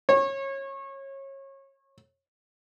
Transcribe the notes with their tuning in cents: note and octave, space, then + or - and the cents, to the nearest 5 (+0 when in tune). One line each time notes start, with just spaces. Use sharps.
C#5 -25